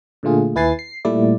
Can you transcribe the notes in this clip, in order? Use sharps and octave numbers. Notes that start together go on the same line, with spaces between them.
A#2 D3 A3 F4 G#4
D#2 E4 B4 G#5 A6 C7
C7
A#2 G3 A3 E4 D5